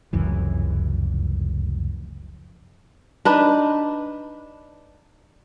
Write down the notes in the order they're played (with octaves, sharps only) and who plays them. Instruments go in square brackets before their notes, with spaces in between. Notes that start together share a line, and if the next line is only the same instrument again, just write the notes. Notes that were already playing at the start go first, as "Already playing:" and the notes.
[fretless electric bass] F1 C#2 F#2 E3
[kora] D4 D#4 B4